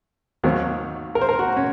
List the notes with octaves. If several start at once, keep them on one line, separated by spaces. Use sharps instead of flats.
D#2 D#3 F#3 C4
A#4
C5
A#4
F#4
C#4